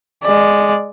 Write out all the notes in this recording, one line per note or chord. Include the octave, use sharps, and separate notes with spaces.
G#3 D5